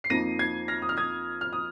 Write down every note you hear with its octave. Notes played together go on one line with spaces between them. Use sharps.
C7
F2 F3 A#3 D#4 A#6 D#7
G#6 C7
F6 A#6
D#6
F6
D#6 G#6
F6
D#6